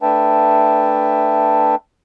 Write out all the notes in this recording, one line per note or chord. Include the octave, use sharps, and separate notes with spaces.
A3 D4 B4 E5 G5 A5